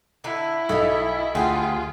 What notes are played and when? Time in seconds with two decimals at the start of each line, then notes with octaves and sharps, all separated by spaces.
0.24 D3 D4 E4
0.69 B1 A4 D#5 F5
1.35 D2 F3 F4 G4 G#4 F#5 G#5